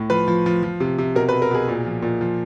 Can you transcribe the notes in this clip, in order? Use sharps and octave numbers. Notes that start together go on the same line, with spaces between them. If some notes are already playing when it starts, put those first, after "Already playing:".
Already playing: A2
F3 B4
F3
F3
F3
C3
C3
B2 A#4
B4
B2
A#4
B2 G#4
A#2
F3
A#2
F3